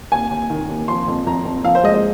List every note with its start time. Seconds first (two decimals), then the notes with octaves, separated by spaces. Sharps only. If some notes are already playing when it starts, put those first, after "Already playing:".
0.12 D#2 G#5
0.31 D#2
0.50 D#3
0.69 D#2
0.88 F3 C6
1.08 F2
1.27 F2 A#5
1.45 F2
1.64 F3 F5
1.75 C5
1.83 G#3 D#5
1.94 D#5